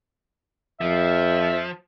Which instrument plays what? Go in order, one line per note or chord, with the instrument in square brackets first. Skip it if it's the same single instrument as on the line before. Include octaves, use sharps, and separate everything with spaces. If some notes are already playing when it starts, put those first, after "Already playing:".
[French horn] F2 [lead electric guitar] F3 [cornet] E5